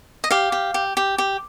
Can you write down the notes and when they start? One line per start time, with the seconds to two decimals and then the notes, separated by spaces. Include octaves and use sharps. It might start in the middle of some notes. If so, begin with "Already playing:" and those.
0.24 D#5
0.31 G4 F5
0.52 G4
0.74 G4
0.97 G4
1.18 G4